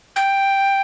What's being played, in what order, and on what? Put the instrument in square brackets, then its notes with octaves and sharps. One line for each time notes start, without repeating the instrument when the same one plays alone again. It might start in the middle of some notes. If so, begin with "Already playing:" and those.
[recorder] G5